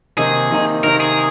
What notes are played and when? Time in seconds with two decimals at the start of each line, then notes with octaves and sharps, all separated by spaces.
0.17 C3 D#3 A#3 D#4 G#4
0.51 C3 D#3 A#3 D#4
0.84 C3 D#3 A#3 D#4 A#4
1.00 G#4